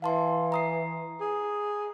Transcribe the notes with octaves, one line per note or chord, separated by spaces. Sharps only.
E3 F5 A5 C6
A#5 D#6 C7
G#4